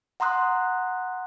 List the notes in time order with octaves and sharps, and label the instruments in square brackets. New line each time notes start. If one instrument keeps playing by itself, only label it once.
[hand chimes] F#5 A#5 C6 D#6 F#6